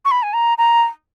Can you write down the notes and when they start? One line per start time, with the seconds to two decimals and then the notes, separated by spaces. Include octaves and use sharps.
0.05 C#6
0.11 B5
0.23 G#5
0.33 A#5
0.58 A#5